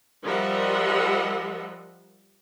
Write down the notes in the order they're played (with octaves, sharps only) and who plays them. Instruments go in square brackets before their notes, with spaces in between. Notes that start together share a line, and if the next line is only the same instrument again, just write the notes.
[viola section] F3 G3 A#4 D#5 E5 F#5